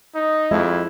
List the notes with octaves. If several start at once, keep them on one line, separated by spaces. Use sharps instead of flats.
D#4
F2 G#3 E4